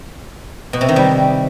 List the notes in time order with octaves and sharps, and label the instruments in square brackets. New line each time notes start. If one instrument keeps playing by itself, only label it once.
[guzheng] B2
C3
D#3
G3